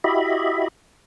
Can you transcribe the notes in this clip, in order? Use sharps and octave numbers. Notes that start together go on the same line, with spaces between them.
E4 F#4 G4 D#5 E5 B5